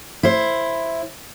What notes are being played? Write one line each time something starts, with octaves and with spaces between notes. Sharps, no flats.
E4 C5